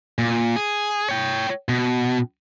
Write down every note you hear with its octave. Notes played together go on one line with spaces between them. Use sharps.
A#2
G#4
C#5 G5
B2